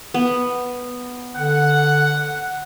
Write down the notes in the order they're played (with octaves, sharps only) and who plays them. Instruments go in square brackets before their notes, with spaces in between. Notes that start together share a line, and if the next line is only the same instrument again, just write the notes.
[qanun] B3
[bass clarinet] D3 [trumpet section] F#5